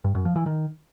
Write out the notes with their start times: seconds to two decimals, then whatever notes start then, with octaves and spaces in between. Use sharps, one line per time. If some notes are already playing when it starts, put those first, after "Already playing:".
0.04 G2
0.15 F#2
0.25 F3
0.36 E3
0.46 D#3